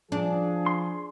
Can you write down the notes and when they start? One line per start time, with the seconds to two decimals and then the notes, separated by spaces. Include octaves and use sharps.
0.12 F3 D4 G#4
0.66 C6